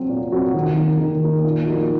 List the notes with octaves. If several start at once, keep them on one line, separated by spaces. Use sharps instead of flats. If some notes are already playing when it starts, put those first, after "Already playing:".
Already playing: F#3 C4 F#4
A#2
F#3 C4 F#4
D#3
A#3 D#4
D#3
A#3 D#4
A#2
F3 A#3 D#4 F#4